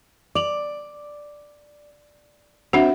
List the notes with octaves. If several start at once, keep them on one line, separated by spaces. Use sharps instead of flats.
D5 D6 F7 F#7
C4 D4 F#4 E5 F#5